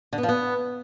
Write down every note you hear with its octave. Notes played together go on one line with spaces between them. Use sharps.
D3
B3
F3
B3